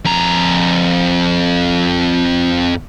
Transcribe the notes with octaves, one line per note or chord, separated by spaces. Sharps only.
F2 A#5